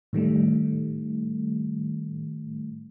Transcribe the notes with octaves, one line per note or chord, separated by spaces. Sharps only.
A2 D#3 G3 A3